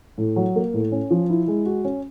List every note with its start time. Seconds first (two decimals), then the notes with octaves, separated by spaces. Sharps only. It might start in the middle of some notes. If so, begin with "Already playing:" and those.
0.18 A2
0.36 F#3
0.56 A#3
0.74 A2
0.92 C#4
1.11 F3
1.30 E4
1.48 G#3
1.66 F#4
1.85 C#4